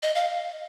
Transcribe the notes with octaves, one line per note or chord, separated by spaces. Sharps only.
D#5
F5